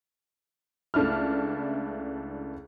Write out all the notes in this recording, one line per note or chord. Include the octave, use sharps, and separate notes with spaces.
C#2 A3 D4 E4 F6